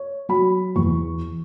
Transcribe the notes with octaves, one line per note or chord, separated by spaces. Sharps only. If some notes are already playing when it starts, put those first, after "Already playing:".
Already playing: C#5
F#3 B5
E2 C#6